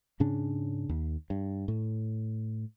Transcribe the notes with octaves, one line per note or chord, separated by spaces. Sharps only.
G#2 C#3 C#4 D4
D#2
G2
A2